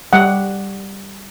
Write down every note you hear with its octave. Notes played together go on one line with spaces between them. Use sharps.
G3 F#5